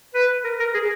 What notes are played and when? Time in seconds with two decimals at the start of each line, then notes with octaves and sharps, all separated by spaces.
0.14 B4
0.44 A#4
0.60 A#4
0.74 G#4